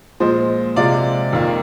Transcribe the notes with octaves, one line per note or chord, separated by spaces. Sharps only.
A#2 F3 G#3 C5 D#5
C3 F3 G#3 D5 F5
F2 D#3 A#3